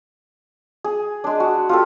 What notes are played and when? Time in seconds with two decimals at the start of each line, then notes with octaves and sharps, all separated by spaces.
0.84 G#4
1.24 G#3 D4
1.40 F#4
1.69 F4 G4 A4